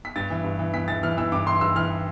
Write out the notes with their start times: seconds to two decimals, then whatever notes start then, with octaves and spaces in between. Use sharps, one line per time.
0.05 B6
0.16 G2 A6
0.30 E3
0.44 G2
0.59 E3
0.74 E3 B6
0.88 E3 A6
1.03 E3 F6
1.17 E3 E6
1.32 G2 D6
1.46 E3 C6
1.61 G2 E6
1.76 E3 F6